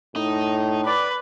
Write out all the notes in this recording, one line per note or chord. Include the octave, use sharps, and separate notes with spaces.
A2 D#4
B4 D5